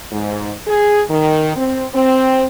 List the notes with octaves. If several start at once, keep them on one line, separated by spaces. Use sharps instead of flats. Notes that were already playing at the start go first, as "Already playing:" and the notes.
G#2
G#4
D#3
C4
C4